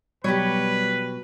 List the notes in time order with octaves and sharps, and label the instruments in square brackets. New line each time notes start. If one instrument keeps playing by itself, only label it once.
[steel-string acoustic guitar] B2 F#3 [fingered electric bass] G3 [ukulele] G4 C#5 [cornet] B4